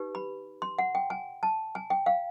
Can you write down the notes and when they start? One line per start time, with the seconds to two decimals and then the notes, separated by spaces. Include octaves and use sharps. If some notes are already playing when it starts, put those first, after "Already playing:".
Already playing: D#4 G4 B4
0.15 B5
0.62 C6
0.78 F#5
0.95 G5
1.10 G#5
1.43 A5
1.75 G#5
1.90 G5
2.06 F5